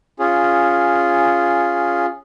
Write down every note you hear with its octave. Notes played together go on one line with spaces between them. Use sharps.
C#4 F4 G#4